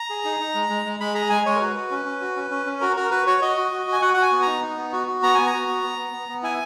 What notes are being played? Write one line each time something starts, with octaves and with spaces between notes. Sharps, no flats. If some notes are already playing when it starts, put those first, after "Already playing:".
Already playing: A#5
G#4
D#4
D#4
G#3
G#3
G#3
G#3 B5
G#4 A#5
G#3 G#5
G#3 C#5
A#4
F#4 B4
F#4
C#4
C#4
F#4
C#4
C#4
C#4
F#4 A#4
F#4 A#4
F#4 B4
F#4 C#5
F#4 D#5
F#4
F#4
F#4
G#5
F#4 F#5
F#4 F#5
G#5
B3
D#4 A#5
D#4
B3
F#4
F#4
B3 A#5
B3 G#5
A#5
F#4
B3
B3
B3
B3
B3
E4 G#5